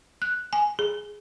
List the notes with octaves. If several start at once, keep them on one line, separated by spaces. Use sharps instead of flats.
F#6
G#5
G#4